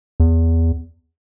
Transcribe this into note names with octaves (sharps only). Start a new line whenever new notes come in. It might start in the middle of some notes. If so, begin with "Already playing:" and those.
E2